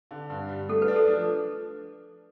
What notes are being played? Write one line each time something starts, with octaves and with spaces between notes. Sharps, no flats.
D3
G2
G3
A3 A4
B4
D4
A4
F3